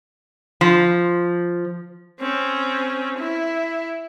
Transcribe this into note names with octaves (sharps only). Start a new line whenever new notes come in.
F3
C4 C#4
E4